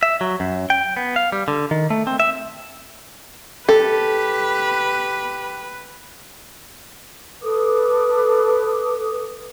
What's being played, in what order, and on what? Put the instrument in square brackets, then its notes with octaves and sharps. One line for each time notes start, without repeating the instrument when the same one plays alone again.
[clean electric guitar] E5
F#3
F#2
G5
B3
F5
G3
D3
D#3
A3
C4
E5
[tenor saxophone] G4 [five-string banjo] A4 [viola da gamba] B4
[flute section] A4 B4 D6 D#6